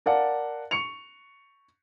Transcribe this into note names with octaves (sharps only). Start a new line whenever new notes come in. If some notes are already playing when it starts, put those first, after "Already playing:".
A#4 D5 F5 F#5 A5
C#6 C#7 F7